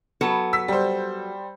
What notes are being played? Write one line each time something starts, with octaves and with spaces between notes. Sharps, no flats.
F#3 B3 A4
E6 B6
G3 C5